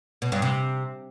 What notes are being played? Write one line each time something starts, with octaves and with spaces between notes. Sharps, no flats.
B2
G2
C3